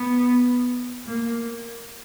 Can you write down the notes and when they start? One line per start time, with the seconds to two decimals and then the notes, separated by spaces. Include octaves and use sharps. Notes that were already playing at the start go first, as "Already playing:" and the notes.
Already playing: B3
1.07 A#3